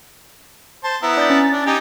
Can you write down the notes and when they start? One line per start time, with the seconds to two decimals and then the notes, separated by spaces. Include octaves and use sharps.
0.84 C5 A5
1.03 B3 E4 A#5
1.17 D4 G6 A6
1.30 C#4 A6
1.52 D4
1.66 D#4 G4 G#5